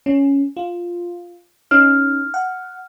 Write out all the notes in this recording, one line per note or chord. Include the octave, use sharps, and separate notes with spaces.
C#4
F4
C#4 D#4 F6
F#5